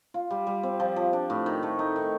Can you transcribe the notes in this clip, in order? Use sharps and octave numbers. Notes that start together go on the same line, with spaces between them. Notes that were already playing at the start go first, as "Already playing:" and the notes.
F4
G3
G3
C4
F3
F3
D4
A2
D#3
A3
D#4
D#3